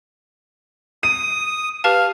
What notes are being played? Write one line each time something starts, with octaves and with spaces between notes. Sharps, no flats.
D#6 D#7
G4 B4 F5 A5